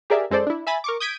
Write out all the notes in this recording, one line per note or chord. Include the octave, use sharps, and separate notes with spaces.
G4 G#4 A#4 D5 E5
F#2 G#3 A4 C5 D5
D4 E4
E5 G#5 B5 A6
A#4 C#6 D6
D#6 G6 G#6 B6 D7 D#7